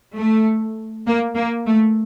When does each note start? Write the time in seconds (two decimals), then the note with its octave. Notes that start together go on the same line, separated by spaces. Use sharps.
0.17 A3
1.07 A#3
1.36 A#3
1.67 A3